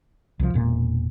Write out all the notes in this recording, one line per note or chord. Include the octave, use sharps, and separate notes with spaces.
C2 F3
E1 A#2